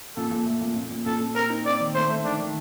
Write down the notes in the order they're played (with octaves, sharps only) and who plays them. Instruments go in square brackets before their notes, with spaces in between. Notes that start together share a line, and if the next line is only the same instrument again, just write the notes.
[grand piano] A#2 [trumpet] A4
[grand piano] A#2
A3
A#2
A#2
A#2
[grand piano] A#2 [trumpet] A4
[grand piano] A#2
[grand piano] C4 [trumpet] A#4
[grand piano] D#4
[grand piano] C4 [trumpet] D5
[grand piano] D#3
[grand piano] A3 [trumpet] C5
[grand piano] A3
[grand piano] D#3 [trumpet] D4
[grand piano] D#3